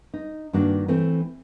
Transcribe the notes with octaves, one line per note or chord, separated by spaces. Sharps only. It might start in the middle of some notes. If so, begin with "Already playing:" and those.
D#4
G2 D#3 A#3 D4 F#4
E3 A3 C4